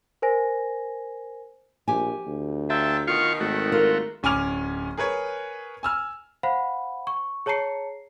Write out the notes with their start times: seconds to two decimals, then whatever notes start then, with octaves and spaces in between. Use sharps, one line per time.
0.22 A#4 C5 G#5 A#6
1.88 A#1 G4 G#5
2.26 D2
2.70 F#3 F4 E5 G5 A5
3.08 B2 D#3 F4 F5 C#6
3.40 G#1 A3 F#4
3.72 G2 D3 F4 A#4
4.23 D1 C#4 G#5 D6 F6 F7
4.97 G#4 A#4 B4 C#5
5.83 G#5 E6 F6
6.43 C5 F5 F#5 B5
7.07 C#6
7.46 G#4 C#5 A5 A#5 C7 C#7